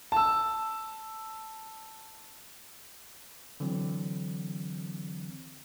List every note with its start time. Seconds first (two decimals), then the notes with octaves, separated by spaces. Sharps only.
0.12 A5 E6
3.60 D3 E3 F#3 C4